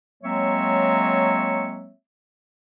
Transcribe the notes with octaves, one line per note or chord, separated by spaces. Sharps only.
F#3 G#3 A#3 C4 C#5 E5